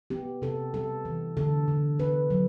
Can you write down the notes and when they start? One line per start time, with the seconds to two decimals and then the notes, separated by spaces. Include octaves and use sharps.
0.10 B3 G4
0.42 C3 A4
0.74 G3 A4
1.05 E3
1.37 D3 A4
1.68 D3
1.99 B3 B4
2.30 F#3